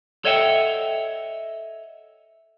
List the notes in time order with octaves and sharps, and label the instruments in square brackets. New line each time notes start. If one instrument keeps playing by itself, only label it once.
[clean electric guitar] A4 C#5 D#5 E5 F#5 G5